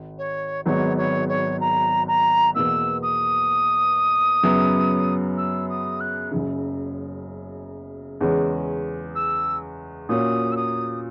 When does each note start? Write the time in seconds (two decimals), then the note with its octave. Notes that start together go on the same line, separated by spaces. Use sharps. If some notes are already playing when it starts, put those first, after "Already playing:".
Already playing: G#1
0.18 C#5
0.66 G#1 G#2 F#3 B3 C#5
0.97 C#5
1.28 C#5
1.60 A#5
2.08 A#5
2.55 E2 B2 A#3 E6
3.02 D#6
4.43 F#2 C#3 F#3 B3
5.37 E6
5.69 D#6
6.00 F#6
6.31 F#1 F#2 C#3
8.21 E2 C#3 G#3 C#4
9.15 E6
10.09 A#2 A#3 C#4 F#4 D#6
10.52 E6
10.56 D#6